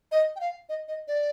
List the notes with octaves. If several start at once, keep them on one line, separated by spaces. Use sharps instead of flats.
D#5
G5
F5
D#5
D#5
D5